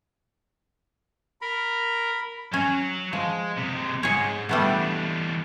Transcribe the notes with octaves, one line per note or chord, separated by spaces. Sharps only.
A#4 B5
F#3 C#4
F3 G#3
C3 G#3
B1 G#2 G#4 C#5
E3 G3 A3 B3 D4